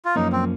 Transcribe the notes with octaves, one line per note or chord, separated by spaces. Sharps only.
F4
F#2 F3 A#3 C#4 D#4
C4